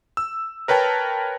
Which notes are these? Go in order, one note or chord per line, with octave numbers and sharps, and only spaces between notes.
E6
A#4 B4 C#5 G5 A5